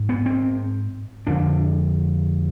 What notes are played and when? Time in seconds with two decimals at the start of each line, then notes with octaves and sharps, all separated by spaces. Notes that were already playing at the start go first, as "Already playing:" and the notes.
Already playing: G#2
0.09 B3
0.26 C4
1.27 F2 D3 D4